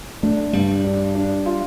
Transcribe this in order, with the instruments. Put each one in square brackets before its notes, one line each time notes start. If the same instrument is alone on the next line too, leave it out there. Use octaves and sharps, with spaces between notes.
[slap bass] A3 [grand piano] D4
[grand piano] G2 [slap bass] G3
[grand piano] D4
D4
F4